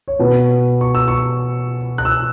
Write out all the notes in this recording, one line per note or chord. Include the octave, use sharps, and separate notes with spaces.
C#5
B2 B3 B4
C#6
E6
C#6
F#6
E6